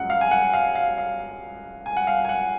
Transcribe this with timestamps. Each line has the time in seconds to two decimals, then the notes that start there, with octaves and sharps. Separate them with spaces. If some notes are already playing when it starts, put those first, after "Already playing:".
Already playing: F#2 F3 G#3 F#5
0.10 F5
0.21 G#5
0.31 F#5
0.54 F5
0.75 F5
0.98 F5
1.86 G#5
1.97 F#5
2.07 F5
2.25 G#5
2.29 F#5